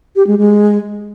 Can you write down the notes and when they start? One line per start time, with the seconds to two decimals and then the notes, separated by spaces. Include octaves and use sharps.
0.16 G4
0.27 G#3
0.38 G#3